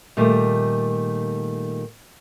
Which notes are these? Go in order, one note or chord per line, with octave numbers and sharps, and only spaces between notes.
A#2 D#3 G3 A3